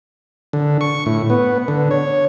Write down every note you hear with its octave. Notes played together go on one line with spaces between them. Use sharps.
D3
C#6
A2
B3
D3
C#5